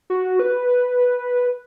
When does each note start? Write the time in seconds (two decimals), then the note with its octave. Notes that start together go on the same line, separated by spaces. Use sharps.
0.10 F#4
0.40 B4